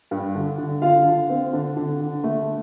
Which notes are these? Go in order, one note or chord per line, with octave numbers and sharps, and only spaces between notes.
G2
D3
D3
D3 F4 F5
D3
C4
D3
D3
D3
A3